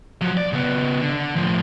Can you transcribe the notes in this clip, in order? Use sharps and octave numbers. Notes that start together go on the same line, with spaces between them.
F3 F#3
D5
C#3 B3
D3
A2 F3